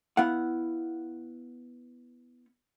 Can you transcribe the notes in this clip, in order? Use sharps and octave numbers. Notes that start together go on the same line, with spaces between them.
B3 E4 F5 F#5